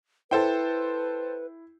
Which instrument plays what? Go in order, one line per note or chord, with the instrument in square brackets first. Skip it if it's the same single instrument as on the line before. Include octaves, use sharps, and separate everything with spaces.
[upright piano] E4 [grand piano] A4 C5 G5 [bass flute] B4